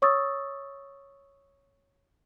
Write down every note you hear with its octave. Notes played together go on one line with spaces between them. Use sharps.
C#5 C#6 D#6 E6 A6